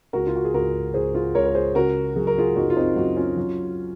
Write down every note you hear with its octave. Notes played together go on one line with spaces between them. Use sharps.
C#2 F#4 A#4
F4
F#4
G#4
C#2 F#4 A#4
C#2 G#4 C5
F4 G#4
C#2 A#4 C#5
A#4
G#4 C5
C#3 F#4 A#4
F#3 G#4
A#4
F4 G#4
F#2 D#4 F#4
F4
C4 D#4
F#2 D#4 F#4
C#4 F4
F#3